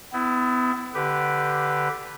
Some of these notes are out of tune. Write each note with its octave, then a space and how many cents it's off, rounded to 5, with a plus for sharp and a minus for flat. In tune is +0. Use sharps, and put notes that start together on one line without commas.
B3 +35 E4 +0
D3 +0 G4 -5 B4 +0